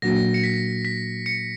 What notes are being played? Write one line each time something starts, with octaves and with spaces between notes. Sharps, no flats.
A#2 F#3 A#3 D4 F#4 A#6
C#7
B6
B6
C#7